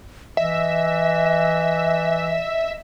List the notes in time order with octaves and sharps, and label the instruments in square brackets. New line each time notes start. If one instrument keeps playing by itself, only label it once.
[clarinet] E3 [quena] D#5 [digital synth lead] E5